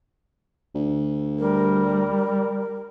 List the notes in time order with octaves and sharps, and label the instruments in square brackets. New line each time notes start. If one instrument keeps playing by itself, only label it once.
[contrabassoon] D2
[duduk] G3 [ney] A#4